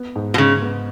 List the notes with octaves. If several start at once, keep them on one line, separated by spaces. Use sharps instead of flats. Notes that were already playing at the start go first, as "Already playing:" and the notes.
Already playing: B3
G#2
B2
G#2 C#3
B3